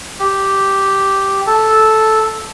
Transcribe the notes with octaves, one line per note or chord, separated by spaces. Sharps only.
G4
A4